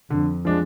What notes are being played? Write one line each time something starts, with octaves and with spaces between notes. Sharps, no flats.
F2 D3
F3 G#3 D4